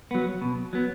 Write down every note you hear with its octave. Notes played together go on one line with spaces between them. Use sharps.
F#3 B3
B2
F#3 B3